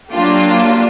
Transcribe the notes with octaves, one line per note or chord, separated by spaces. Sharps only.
F#3 A#3 D4 F4 G4